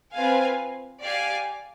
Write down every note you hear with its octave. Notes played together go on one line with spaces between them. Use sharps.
C4 F4 B4 F5 G#5
G4 D5 F5 G#5